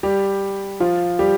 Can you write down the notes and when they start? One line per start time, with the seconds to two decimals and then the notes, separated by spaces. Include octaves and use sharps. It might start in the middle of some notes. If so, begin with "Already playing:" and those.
0.03 G3 G4
0.80 F3 F4
1.19 G3 G4